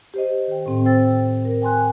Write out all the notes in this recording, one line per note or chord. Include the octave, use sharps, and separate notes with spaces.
G4 C5 D#5
D#3 G5
A2 C4
C5 G5 E6 A6
A#4
G5 G#5 C6 F#6